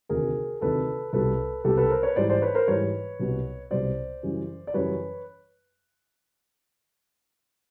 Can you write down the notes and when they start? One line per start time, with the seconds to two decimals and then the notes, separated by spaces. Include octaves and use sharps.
0.09 D2 C3 D#3 G#4 A#4
0.61 D2 C3 D#3 A4 B4
1.13 C2 B2 G3 A4 B4
1.64 C2 B2 G3 G4 A4
1.77 A4 B4
1.90 A#4 C5
2.03 B4 C#5
2.16 G#2 E3 G3 C5 D5
2.29 C5 D5
2.42 B4 C#5
2.55 A#4 C5
2.68 G#2 E3 G3 B4 C#5
3.20 C2 B2 G3
3.71 C2 B2 G3 C5 D5
4.23 F#2 C#3 E3 G3
4.67 D5
4.74 F#2 C#3 E3 G3 B4 C#5